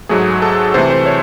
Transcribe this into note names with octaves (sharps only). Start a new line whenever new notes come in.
G#2 F#3 A3 G#4
A4
C3 E3 A3 C5
C5
C#5